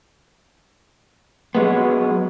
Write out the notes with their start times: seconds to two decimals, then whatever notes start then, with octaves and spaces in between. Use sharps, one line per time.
1.55 F#3 G#3 B3